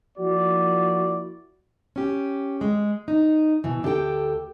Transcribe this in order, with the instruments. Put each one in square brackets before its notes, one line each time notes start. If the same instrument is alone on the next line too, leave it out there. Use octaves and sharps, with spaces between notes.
[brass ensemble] F3 A#3 E4 F#4 D5
[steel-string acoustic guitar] C#4 G4
G#3
D#4
B2 E3
D2 D4 G4 A4 G5